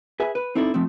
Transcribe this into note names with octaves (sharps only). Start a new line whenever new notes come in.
G#4 B4 E5 G#5
B4
C4 D#4 E4 A4 B4 D5
F3 A3 C4